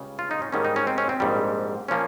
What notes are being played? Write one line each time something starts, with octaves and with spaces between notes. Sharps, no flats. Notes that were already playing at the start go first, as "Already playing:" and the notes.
Already playing: C#2 C#3 G3
F4
D#4
C#4
G#2 D#3 G3 A#3 C#4
D#4
C#4
C4
C#4
C4
A#1 G#2 G3
A#2 F3 A#3 C#4